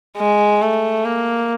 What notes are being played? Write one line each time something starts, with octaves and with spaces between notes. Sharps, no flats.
G#3
A3
A#3